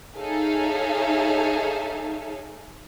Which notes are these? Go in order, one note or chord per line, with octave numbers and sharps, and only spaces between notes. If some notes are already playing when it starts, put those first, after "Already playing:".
D#4 G#4 A4 C#5 E5 F5